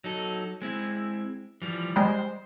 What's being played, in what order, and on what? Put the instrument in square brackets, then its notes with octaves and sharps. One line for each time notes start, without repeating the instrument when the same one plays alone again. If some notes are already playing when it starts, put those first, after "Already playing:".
[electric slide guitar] F#3 D#4 A4
G#3 C4 E4
E3 F3 G3
[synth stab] G3 G#3 [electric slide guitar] C5